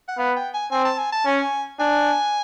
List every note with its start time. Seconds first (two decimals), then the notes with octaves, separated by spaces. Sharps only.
0.08 F#5
0.18 B3 F5
0.36 G5
0.54 G#5
0.72 C4 G#5
0.85 A5
0.99 G#5
1.13 A5
1.25 C#4 G#5
1.79 D4 G#5